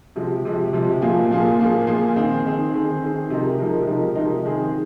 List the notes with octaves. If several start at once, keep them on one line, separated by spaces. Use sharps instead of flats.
C3 F3 G#3
C3 F3 G#3
C3 F3 G#3
A#2 F3 A#3 F4 G#4
A#2 F3 A#3 F4 G#4
A#2 F3 A#3 F4 G#4
A#2 F3 A#3 F4 G#4
D#3 C4 G#4
D#3 C4 G#4
D#3 C4 G#4
D#3 C4 G#4
C3 F3 G#3 D#4 A#4
C3 F3 G#3 D#4 A#4
C3 F3 G#3 D#4 A#4
C3 F3 G#3 D#4 A#4
D#3 G#3 C4 G#4